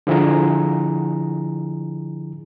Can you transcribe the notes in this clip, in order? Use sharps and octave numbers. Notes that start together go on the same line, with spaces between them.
D3 F3 E4 G#4 A#5